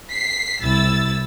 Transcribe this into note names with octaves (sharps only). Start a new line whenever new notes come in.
B6 C7
C2 E4 E6 A6